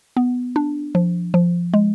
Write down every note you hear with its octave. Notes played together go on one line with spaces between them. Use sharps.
B3
D4
F3
F3
G#3